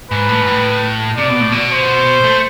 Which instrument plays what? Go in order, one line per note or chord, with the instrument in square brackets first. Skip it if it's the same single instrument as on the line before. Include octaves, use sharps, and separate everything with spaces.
[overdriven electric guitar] G#2 [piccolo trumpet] B4
[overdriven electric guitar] A2
G#2
A2
[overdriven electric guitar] C3 [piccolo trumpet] D5
[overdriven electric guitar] B2
A2
B2
[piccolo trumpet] C5
[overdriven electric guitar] A3